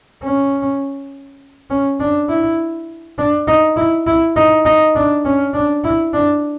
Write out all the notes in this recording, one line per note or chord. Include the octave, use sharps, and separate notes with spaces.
C#4
C#4
D4
E4
D4
D#4
E4
E4
D#4
D#4
D4
C#4
D4
E4
D4